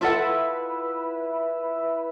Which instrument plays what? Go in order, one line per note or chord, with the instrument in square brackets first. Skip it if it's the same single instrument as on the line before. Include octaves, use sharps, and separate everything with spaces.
[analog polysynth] E4 B4 E5 [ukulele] F4 A4 F#5